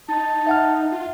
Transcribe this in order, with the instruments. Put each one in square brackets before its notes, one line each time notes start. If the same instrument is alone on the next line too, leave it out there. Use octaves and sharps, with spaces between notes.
[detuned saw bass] D#4 [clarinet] A5
[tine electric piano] E5 F#5 F6
[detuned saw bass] F4